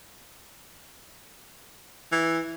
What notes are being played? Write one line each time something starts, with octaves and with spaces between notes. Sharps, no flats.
E3